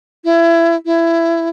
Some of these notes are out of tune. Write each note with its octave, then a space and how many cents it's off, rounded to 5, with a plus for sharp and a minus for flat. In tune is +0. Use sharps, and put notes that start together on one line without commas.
E4 +25
E4 +20